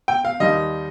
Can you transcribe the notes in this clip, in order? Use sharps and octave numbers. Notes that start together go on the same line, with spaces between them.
G5
F5
D#2 D#3 G3 D#5